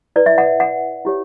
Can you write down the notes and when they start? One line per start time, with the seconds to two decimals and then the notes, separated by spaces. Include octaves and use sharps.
0.16 E4 B4 D5
0.26 E5
0.38 F#5
0.60 F#5
1.05 E4 G4 C#5